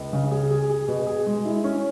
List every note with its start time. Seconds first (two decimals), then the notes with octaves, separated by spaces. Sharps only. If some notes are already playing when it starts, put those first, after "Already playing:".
Already playing: C#2
0.13 C#3
0.31 G#4
0.50 G#4
0.70 G#4
0.88 B2
1.07 G#4
1.27 G#3
1.45 E4
1.64 C#4